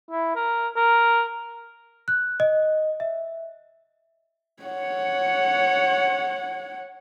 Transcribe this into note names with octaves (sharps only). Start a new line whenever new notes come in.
E4
A#4
A#4
F#6
D#5
E5
C#5 F#5